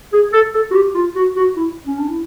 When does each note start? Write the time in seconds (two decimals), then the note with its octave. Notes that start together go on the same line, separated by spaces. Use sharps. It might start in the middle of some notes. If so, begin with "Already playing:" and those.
0.12 G#4
0.33 A4
0.53 A4
0.71 F#4
0.74 G4
0.94 F4
1.15 F#4
1.36 F#4
1.56 E4
1.86 C#4
1.98 D4
2.09 E4